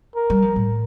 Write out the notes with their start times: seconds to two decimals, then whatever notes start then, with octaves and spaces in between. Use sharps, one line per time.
0.16 A#4
0.30 G3
0.42 F3
0.56 A2